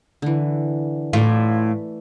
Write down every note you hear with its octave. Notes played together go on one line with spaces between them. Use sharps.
D3 E3
A2 E3 A3 F4 D5